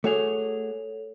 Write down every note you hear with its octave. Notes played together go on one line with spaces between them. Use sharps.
A3 F#4 G#4 A4 C#5 F7